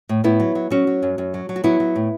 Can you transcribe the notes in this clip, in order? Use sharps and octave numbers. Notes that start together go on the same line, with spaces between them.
A2
A2 B3 E4
F#3
F#3
F#3 C#4 F#4
F#3
F#2
F#2
F#3
F#3
F#4
F#3 B3 E4
F#3
A2